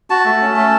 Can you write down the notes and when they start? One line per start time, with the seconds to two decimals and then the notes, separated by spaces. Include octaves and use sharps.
0.10 F#4 A5
0.25 A3
0.41 C#4
0.56 A3